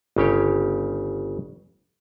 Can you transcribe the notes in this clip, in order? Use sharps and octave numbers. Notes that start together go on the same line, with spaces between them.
G1 C#3 G4 C#5